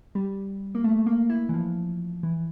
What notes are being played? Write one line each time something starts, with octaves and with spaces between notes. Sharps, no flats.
G3
A#3
A3
A#3
E4
E3
F3
E3